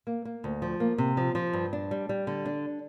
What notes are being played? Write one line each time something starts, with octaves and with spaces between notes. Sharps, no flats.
A#3
A#3
D2
F3
A#3
C3
F3
F3
G2
D4
G3
G3
D3
D4